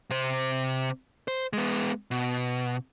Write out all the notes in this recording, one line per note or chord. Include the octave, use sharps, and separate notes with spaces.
C3 C5
C5
G#3 B3
B2